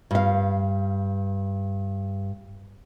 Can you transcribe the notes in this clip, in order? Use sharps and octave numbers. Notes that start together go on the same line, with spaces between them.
G2 F5